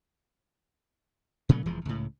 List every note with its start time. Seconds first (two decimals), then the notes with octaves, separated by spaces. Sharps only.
1.49 A#2 C#3 F#3 A3
1.66 E1 E3 F3 G#3
1.85 C#2 A2